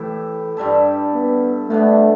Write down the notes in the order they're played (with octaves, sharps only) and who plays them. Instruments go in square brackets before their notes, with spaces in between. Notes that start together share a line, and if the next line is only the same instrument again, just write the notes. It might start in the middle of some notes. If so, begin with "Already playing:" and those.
Already playing: [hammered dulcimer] A2 E4 G4 [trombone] E3
[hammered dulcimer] G2 G3 E4 A4
[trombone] B3
[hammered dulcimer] B2 B3 D4 [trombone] A3